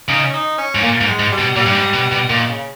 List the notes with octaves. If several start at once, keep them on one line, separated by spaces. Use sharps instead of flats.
C#3 D#4
C#4
D#4
C#4
G#2
A#2 A#3
G#2
G#3
G#2
G3
B2
A#2 G3
G2
G#2
B2
B2
A#2 D#3
C#3